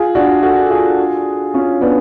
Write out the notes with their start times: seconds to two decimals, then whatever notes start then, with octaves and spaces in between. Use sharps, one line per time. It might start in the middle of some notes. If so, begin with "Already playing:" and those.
Already playing: F4 G#4
0.15 D4 F#4
0.43 F#4 A4
0.62 A4
0.70 F4 G#4
1.54 C#4 F4
1.81 B3 D4